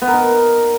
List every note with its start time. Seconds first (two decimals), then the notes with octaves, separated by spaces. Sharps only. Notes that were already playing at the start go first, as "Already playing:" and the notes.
0.02 B3
0.08 A#4
0.14 D#4